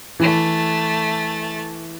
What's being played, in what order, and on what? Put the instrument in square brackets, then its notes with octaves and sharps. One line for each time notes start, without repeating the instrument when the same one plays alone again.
[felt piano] E3 [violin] A3 A6